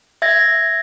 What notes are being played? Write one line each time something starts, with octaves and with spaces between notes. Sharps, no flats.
E5 G#6 A#6